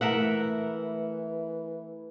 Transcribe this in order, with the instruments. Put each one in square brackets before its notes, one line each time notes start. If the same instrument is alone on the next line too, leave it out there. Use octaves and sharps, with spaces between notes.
[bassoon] E3 [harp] A3 [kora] A#4 E5 F#5